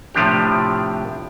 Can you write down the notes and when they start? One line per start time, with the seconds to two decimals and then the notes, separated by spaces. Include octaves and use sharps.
0.15 A2 C3 F3 D4 G4